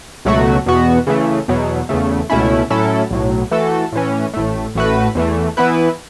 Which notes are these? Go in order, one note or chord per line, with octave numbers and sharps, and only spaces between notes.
C#2 B2 F#3 A3 F#4
E2 B2 B3 F#4
C#3 E3 A3
E2 B2 F#3
E2 C#3 A3
C#2 B2 A3 C#4 E4
A2 F#3 C#4 E4 A4
B1 A2 F#3
E3 A3 F#4 A4
A2 E3 C#4
A1 A2 A3
A1 A2 A3 F#4 B4
E2 E3 A3
E3 B3 E4 B4